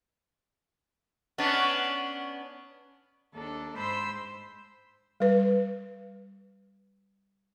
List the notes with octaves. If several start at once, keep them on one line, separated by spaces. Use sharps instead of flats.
B3 C#4 D4
D#2 D4 A4
G#2 C5 B5 C6 E6 G6
G3 B4